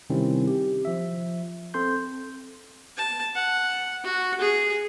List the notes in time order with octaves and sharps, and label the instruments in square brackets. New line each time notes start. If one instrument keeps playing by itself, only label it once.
[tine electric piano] C3 D#3 G3 C4 C#4 E4
G4
F3 E5
C4 A4 C6 G6
[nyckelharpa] A5
F#5
F#4
G#4